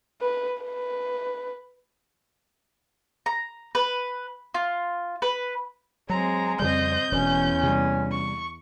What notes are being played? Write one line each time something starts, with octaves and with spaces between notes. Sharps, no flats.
B4
B4
A#5
B4
F4
B4
F#3 G#3 C4 A#5
F2 C#3 G3 C4 D#5 G6
E1 E2 B2 C#4
C3 G3
C#6